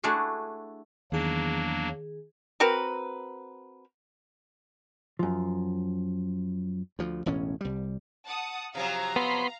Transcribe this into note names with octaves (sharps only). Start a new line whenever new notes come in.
A3 D4 E4 F#4 G#4
E2 D#3 F#3 A#3 D4 G#4
C4 F#4 A#4 B4
F#2 F3
D2 F3
E1 A1 A2 C#4
C2 G3
F#5 A5 D#6
C3 F3 F#3 F5 A#5
B3 B5 C6